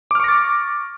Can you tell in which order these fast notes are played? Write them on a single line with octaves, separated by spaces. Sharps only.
D6 F6 C#6 A#6 A6